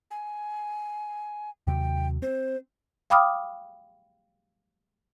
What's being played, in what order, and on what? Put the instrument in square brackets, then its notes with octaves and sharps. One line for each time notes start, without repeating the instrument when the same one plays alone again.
[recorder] G#5
[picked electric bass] D#2 C3 F#3 [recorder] G5
[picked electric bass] C4 [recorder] C5
[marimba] F5 G5 B5 D6 D#6 F6